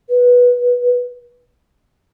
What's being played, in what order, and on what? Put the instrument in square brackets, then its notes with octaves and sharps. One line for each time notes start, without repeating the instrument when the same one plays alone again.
[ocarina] B4